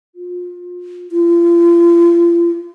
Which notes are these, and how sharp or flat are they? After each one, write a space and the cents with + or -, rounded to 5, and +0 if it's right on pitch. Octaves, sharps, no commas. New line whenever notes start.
F4 +30
F4 -40